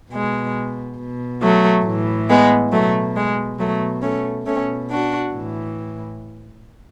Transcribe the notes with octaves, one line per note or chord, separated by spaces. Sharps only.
B2 G#3
B2
F#3 A3
A2 E3
G#3 B3
B2 F#3 A3
G#3
B2 F#3 A3
A3 C#4
B2 A3 C#4
D4 F#4
A2 E3